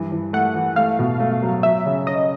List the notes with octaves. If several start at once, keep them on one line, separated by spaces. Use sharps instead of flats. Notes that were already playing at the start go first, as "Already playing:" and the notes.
Already playing: G2 E3
E3
A3 F#5
E3
A3 F5
B2
A3
F#3
F#3 E5
C#3
C#4 D#5